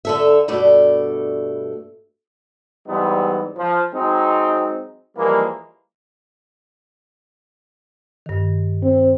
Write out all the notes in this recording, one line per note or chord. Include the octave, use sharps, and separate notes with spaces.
D3 A4 E5
G2 B2 A3 D5
G#2 E3 G3 B3 C4 D#4
F3
F#3 G#3 C4 D#4
E3 F3 G3 G#3 A#3
G2 D#3
C4